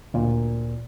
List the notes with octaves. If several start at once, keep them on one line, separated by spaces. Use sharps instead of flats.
D2 A#2